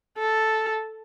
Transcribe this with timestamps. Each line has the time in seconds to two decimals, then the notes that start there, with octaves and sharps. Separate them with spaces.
0.19 A4